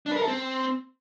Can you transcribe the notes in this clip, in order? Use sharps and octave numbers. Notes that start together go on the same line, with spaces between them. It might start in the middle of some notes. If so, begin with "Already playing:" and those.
D4
B4
A#4
A4
C4